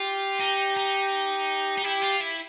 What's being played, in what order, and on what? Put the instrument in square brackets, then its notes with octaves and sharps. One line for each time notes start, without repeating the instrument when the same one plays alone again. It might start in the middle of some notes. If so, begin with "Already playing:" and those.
Already playing: [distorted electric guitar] F4 [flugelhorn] G4
[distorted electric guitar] D#4
D#4
D#4
[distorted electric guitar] E4 [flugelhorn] G4
[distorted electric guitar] F4
E4